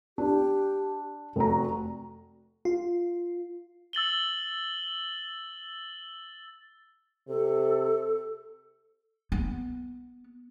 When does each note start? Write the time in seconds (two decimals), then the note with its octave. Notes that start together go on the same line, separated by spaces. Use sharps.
0.18 D4 G4
1.36 F1 F#4 A#5
2.65 F4
3.93 E6 A6 F#7 G7
7.28 C3 A4
9.32 B3